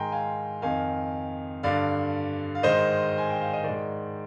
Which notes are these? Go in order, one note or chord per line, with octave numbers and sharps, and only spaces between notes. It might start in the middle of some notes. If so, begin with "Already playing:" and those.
Already playing: G#2 D#3 G5 G#5 A#5 C6
F5 G#5
F2 D#3 F5 G#5
G2 D3 D5 F5
F5
G#2 D#3 C5 D#5
G#5
G5
F5
D#5
D#3 D5
G#2